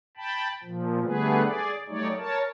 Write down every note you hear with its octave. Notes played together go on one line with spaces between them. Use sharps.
G5 A5 B5
A#2 F3
D3 G3 A3 B3 G#4 B4
G#4 D5
F#3 G3 A3 D#4 C#5 D5
A#4 C#5 A5